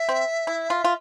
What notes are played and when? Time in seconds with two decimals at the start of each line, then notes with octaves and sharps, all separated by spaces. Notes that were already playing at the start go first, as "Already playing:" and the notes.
Already playing: E5
0.09 C4
0.47 E4
0.70 F4
0.84 F4